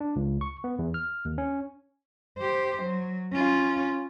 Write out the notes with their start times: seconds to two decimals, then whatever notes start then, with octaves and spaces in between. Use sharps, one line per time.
0.01 D4
0.16 C#2
0.41 C#6
0.64 B3
0.79 E2
0.94 F6
1.25 D#2
1.38 C#4
2.39 G4 C5
2.83 F#3
3.33 C#4 F4